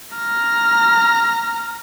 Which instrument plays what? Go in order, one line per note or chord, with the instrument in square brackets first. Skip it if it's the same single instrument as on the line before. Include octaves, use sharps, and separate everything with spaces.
[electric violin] A#5 F6